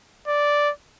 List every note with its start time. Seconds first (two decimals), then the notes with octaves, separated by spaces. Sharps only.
0.28 D5